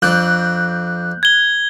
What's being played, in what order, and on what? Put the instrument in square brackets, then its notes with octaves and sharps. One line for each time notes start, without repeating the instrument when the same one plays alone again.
[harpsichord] F2 D4 [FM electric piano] F#6 G6
[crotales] G#6 G7